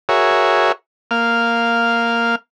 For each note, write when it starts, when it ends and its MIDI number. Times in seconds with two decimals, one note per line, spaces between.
0.09 0.72 66
0.09 0.72 68
0.09 0.72 70
0.09 0.72 73
0.09 0.72 76
1.11 2.36 58
1.11 2.36 77
1.11 2.36 89